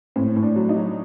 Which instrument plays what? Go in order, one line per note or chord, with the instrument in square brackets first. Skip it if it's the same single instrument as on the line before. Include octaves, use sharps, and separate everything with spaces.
[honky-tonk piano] A2 C4
A2
D4
F#3
D#4
F#3